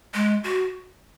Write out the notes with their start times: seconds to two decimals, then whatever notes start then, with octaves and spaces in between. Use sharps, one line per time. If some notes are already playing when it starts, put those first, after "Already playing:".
0.14 G#3
0.44 F#4